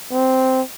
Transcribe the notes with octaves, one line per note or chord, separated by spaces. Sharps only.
C4